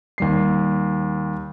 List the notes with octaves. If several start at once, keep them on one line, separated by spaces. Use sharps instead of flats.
D#2 G3 C7